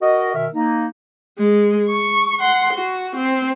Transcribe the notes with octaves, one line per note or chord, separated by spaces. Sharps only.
F#4 A#4 D#5
B2 D#3 A#4 E5
A#3 D#4
G#3
C#6
F#5 C6
F#4
C4